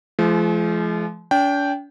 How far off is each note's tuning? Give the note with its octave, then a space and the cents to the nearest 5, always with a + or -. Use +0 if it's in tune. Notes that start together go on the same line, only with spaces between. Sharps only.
F3 -30 G#3 +40
D4 -45 G5 +0